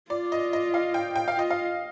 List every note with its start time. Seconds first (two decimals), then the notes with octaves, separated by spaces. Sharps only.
0.10 F4 D5
0.32 D#5
0.53 D#5
0.74 F5
0.94 G5
1.16 G5
1.28 F5
1.37 F4 D#5
1.50 F5